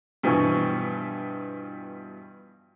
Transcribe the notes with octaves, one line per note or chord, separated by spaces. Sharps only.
G2 B2 E3 F3 G#5 C#6